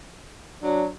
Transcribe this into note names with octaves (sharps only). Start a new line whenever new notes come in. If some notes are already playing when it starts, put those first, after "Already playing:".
F#3 D4